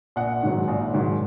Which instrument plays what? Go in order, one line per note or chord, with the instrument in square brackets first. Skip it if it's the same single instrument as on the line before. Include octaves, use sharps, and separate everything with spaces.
[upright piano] A#1 F#5
G#2 D#3 F#3
A#1
G#2 D#3 F#3